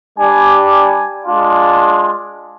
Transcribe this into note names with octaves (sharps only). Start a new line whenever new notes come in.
G3 D4 G4 G#5
G#5
G#3 D4 F4